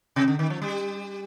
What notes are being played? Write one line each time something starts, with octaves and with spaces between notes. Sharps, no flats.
C3
D3
D#3
F3
G3